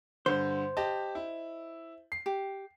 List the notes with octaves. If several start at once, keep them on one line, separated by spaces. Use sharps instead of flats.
G2 D3 C5
G4 D#5 A5
E4
C7
G4